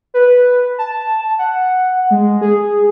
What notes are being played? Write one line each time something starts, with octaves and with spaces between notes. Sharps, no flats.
B4
A5
F#5
G#3
G#4